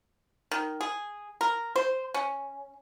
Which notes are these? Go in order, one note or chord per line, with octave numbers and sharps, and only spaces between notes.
D#3
G#4
A#4
C5
C#4